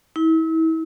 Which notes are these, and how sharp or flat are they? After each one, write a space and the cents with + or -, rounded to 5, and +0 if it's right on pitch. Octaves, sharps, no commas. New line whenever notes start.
E4 -35